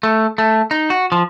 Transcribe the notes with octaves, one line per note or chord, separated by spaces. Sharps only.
A3
A3
D#4
F#4
F3